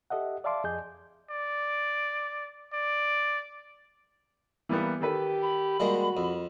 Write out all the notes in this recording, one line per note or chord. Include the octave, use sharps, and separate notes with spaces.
G4 A4 D#5 E5 F#5
D5 E5 F5 A5 C6 D6
F2 G#4 D#5 G#5 G6
D5
D5
E3 G3 A#3 B3
D#3 G4 A4 B4
B5
G3 G#3 A#3 F#4
F2